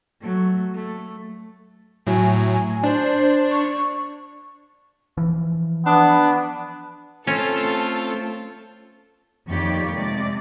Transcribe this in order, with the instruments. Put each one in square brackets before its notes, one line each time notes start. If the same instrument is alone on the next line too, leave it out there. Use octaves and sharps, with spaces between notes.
[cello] F#3 A3
A3
[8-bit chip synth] A2 F#3 [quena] G#5
[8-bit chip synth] D4 [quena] C5
[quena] C#6
[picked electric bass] E3 F3
[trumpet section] B3 [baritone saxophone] D4
[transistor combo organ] A3 C4 [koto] C#4 [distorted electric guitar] F4 [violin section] A4
[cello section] F2 D#3 A#3 G4 C#5 D5
C3 G#3 D5